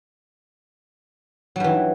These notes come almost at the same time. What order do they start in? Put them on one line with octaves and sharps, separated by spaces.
F#3 G2 E3